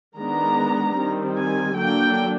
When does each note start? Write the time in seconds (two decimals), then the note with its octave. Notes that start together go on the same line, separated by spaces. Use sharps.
0.18 D#3 G#3 B3 D4 A#5
0.97 D#3 G3 C4
1.37 G#5
1.77 D3 F#3 A#3 D4 G5